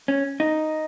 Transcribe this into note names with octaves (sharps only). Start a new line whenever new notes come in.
C#4
D#4